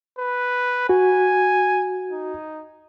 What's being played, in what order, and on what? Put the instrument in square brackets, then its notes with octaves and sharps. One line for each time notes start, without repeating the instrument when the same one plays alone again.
[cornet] B4
[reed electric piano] F#4 [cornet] G#5
[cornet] D#4